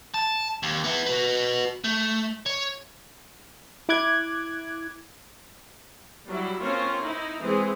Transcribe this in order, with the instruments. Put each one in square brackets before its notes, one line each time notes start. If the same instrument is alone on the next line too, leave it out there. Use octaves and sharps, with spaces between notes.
[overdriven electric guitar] A5
D#2
B3 E4
F#4 B4
A3
C#5
[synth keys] E4 D6 F#6 G#6
[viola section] F#3 G3 E4
A#3 C4 C#4 F4 C5 C#5
D#4 E4
E3 G#3 C4 G#4